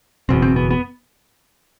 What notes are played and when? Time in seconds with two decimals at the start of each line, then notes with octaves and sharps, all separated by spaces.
0.29 F#1 E2 B2 C4
0.42 C4
0.56 B3
0.71 B3